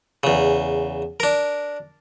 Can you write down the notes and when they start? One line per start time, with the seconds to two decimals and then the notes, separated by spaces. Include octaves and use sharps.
0.23 E2 C#3
1.20 D4 A#4